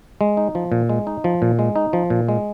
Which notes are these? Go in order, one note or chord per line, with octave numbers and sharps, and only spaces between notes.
G#3
D#4
F3
A#2
G#3
D#4
F3
A#2
G#3
D#4
F3
A#2
G#3